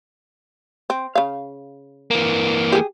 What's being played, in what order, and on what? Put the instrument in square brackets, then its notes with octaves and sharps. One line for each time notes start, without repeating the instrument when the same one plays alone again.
[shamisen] C4
C#3 F5
[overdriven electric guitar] E3 A#3
[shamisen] G4 G#4